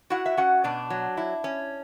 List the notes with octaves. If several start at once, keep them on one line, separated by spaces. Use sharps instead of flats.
E4 F#4 F#5
E5
C#4 F#4 F#5
B2 D4 D5
F#3
E4
C#4